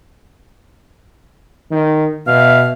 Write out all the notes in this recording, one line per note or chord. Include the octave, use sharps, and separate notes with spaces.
D#3
B2 E5 F5